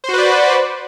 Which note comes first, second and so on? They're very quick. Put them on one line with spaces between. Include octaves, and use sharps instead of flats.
C5 F#4 B4 D5